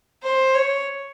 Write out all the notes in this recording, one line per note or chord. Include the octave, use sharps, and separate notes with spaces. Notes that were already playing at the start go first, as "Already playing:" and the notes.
C5
C#5